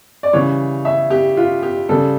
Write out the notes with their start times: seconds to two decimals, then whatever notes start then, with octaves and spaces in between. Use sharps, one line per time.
0.23 D5
0.33 C#3 E3 G3 C#5
0.85 E5
1.10 G4
1.37 F4
1.63 G4
1.89 C#3 G3 A4